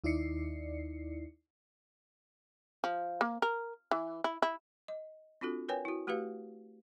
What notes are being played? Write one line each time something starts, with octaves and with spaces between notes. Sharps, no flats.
D#2 D#4 E4 D5 C7 C#7
F3
A#3
A#4
E3
E4
E4
D#5
C4 D4 F4 F#4 A4
A#4 B4 C#5 G5 G#5
E4 F#4
A3 F#4 G4 B4 F5